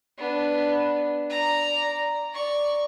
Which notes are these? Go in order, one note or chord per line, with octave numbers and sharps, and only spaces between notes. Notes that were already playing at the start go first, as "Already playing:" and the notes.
B3 D4
D5 A#5
D5 C#6